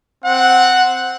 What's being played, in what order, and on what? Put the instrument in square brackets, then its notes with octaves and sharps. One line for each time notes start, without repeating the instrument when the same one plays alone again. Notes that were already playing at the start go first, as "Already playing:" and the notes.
[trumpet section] C4 F#5